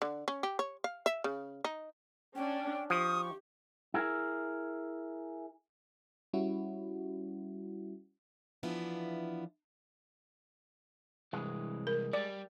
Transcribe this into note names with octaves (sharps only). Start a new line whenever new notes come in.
D3
C#4
G4
C#5
F5
E5
C#3
D#4
C#4 D4 G5
F3 G4 C#6 D#6
E4 G#4 A#4
G3 C#4 E4 F#4
E3 F3 B3 D4 E4 F4
C2 E3 G#3
A#4
G3 D5